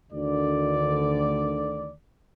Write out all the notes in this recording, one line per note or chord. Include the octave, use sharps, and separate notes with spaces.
D2 D3 D#3 D5